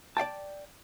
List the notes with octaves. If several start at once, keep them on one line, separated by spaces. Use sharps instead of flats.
D5 F5 G5 A5